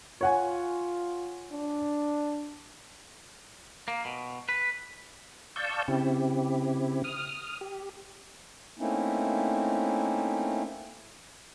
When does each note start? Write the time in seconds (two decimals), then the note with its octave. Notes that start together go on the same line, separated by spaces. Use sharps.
0.21 F4 C#5 F#5 G#5
1.52 D4
3.88 A#3
4.05 B2
4.49 B4
5.56 D5 F5 A5 C#6 E6 G6
5.88 C#3 C4 E4 G4
7.04 D#6 F6
7.61 G4
8.79 A3 A#3 C4 C#4 D#4 E4